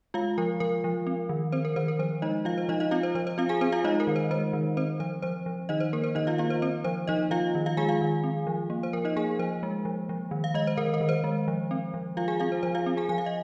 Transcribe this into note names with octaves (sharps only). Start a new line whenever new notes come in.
G#3 F4 F5
F3 A#4
F3 A#4
F3
C4
D#3
C4 C5
A#4
D#3 C5
A#4
F3 C5
G#3 D#4 D#5
F3 F4 F5
C5
F3 D#4 D#5
D#4 D#5
C4 F4 F5
C5
F3 C5
C5
C4 F4 F5
G#4 G#5
C4 C5
F4 F5
G#3 D#4 D#5
A#4
D#3
C5
G#3 C5
D#3
C4 C5
F3 C5
F3 C5
F3
D#3 D#4 D#5
C5
A#3 A#4
C5
D#3 D#4 D#5
F4 F5
A#3 F4 F5
C5
C4 C5
F3 C5
F3 D#4 D#5
F3 F4 F5
D#3
F4 F5
G#3 G#4 G#5
F4 F5
D#3
C4
F3
A#3
C5
F3 A#4
D#4 D#5
A#3 G#4 G#5
F3 C5
G#3
F3
F3
D#3
F5
G#3 D#5
C5
D#3 A#4
A#4
D#3
C5
G#3
F3
C4
F3
F3 F4 F5
G#4 G#5
C4 F4 F5
C5
F3 C5
F4 F5
C4
G#4 G#5
F3 G#5
F5
D#5